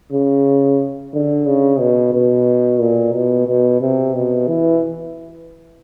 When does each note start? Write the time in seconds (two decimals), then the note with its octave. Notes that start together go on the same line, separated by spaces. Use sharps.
0.12 C#3
1.13 D3
1.46 C#3
1.80 B2
2.13 B2
2.80 A#2
3.13 B2
3.48 B2
3.81 C3
4.14 B2
4.48 E3